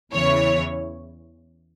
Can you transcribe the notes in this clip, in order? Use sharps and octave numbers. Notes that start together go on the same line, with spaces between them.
E2 C#3 E3 C#5